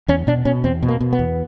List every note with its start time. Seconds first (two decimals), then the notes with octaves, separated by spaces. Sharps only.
0.08 E2 C#4
0.27 B2 D4
0.45 B2 C#4
0.64 E2 C4
0.83 B2
0.88 A#3
1.00 B2
1.13 B3
1.19 E2